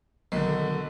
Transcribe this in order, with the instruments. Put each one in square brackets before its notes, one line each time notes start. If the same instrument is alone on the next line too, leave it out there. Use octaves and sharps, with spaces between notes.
[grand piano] B1 D3 [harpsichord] D#3